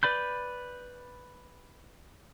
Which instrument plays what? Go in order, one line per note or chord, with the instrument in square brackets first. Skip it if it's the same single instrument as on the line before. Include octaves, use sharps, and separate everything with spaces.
[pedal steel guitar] B4 D5 B5 G6